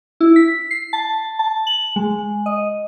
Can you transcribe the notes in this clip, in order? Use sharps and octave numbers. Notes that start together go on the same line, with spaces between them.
E4
B6
C7
A5
A5
F#7
G#3
D#5